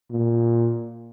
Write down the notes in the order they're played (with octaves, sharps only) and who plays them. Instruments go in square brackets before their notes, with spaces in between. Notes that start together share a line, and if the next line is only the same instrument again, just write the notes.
[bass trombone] A#2